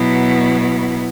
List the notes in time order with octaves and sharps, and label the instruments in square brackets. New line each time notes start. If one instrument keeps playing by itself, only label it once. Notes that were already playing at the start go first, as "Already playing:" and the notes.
Already playing: [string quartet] B2 F#3 B3 E4